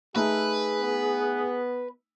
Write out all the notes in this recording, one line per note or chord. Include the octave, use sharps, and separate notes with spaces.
A3 D#4 G#4 B4 E5
B3